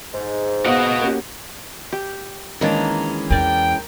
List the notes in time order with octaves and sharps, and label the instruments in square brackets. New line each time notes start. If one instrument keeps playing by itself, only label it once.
[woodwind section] G#2
[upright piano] B3 F5 F#5 [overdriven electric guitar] F#4 D#5
[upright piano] A#3 C#4 G4
[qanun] G4
[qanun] D#3 A#3 D4 [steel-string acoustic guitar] E3 G#3 C#4
[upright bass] E2 [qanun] A#4 D5 [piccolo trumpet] G5